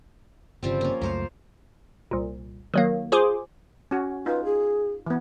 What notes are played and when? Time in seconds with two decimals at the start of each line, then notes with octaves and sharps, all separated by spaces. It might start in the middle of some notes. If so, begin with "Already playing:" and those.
0.63 G1 C#3 F3 G3 C4
0.81 A#3 C#4
1.01 C#2 F#2 A3 A#4 C5 F5
2.11 C2 A#2
2.74 D#3 F#3 A#3
3.12 F4 G#4 C5 G#5 C6 D6
3.91 C#4 F#4
4.26 D#4 F4 B4
4.44 G#4
5.06 E3 B3